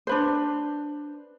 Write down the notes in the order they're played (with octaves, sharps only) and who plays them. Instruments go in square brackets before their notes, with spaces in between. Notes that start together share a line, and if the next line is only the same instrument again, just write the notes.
[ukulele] D4 B4 C5